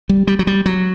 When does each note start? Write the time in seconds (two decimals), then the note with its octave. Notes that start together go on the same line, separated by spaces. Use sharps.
0.09 G3
0.27 G3
0.39 F#3
0.47 G3
0.66 F#3